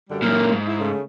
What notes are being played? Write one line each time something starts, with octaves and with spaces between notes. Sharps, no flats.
F#2 D3 G3
F#2 A#2 A#4
G#2
E4
C#3 A3